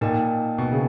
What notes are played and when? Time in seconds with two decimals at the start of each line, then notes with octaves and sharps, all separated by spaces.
0.01 A#2 D#4 A#4 D#5 G5
0.58 B2
0.72 C#3